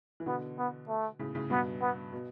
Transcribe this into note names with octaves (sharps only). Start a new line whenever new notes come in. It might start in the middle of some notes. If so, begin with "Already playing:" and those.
E3
B2 D3 B3
B3
A3
A2 C#3
A2 C#3
G2 B2 B3
B3
B2